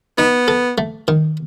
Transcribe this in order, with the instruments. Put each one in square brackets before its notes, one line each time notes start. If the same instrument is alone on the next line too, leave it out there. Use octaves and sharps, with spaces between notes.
[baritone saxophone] B3 [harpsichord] D#4
[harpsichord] A4
A3
D#3